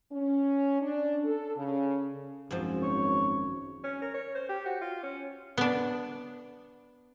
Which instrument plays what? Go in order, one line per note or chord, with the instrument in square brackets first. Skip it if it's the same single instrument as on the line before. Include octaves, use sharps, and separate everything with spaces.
[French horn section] C#4
D4
A4
C#3
[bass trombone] G#1 [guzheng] F#2 F3
[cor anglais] C#5
[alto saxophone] C#4
A#4
C#5
C5
G4
F#4
F4
C#4
[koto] B3 D4